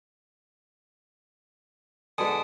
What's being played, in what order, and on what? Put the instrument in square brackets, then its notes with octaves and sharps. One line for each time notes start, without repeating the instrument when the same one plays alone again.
[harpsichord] G#2 B2 D3 [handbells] G#5 A5 D#6